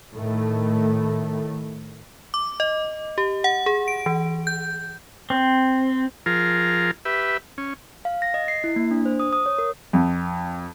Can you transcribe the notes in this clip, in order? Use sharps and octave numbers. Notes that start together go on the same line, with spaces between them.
A2 D#3 A3
D6
D#5
G4
F#5
G#4
D7
E3
G6
C4
F3 F4 G#4 A#4
G4 B4 E5
C#4
F5
A#6
D#5
C7
E4
A#3
D4
C5
D#6
D#6
C#5
A#4
F2